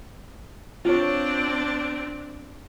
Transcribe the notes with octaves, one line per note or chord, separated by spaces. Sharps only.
C4 D4 F4 C#5